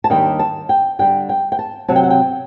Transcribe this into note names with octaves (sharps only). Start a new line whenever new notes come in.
A5
D#2 D#3 G3 D4 G5
A5
G5
D3 G3 D4 G5
G5
G5
A5
C3 F#3 C4 A5
G5
F#5
G5